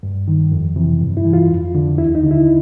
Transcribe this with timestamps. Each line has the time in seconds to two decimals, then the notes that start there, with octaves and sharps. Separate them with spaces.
0.03 G2
0.28 D#3
0.52 F2
0.76 C3 E3
1.01 G2
1.17 E4
1.25 E3
1.33 F4
1.49 F2
1.75 D3
1.98 D#2 E4
2.15 D#4
2.23 D3
2.31 E4